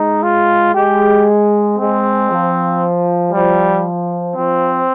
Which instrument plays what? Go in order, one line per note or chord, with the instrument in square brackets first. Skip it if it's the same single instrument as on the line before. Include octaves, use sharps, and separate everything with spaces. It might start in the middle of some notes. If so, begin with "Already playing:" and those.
Already playing: [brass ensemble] G#3 [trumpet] D#4
[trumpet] F4
[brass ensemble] G#3 [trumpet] G4
[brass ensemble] G#3 [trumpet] C4
[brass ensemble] F3
[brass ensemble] F3 [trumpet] G3
[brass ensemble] F3 [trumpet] C4